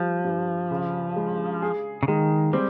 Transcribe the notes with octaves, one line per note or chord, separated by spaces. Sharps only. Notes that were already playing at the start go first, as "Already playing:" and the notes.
Already playing: F3 G3
G2
C#3
G#3
G#4
C#3
D#3 G#3
G3 C4